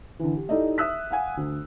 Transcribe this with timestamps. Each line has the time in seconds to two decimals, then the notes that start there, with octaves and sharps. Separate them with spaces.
0.19 D3 E3
0.35 G4
0.49 D#4 E4 G4 A4 D5 D#5
0.78 E5 D#6 E6 F#6 B6
1.11 F5 F#5 G#5
1.37 D2